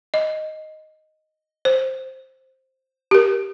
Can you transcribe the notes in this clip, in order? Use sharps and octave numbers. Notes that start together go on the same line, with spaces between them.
D#5
C5
G4
A#4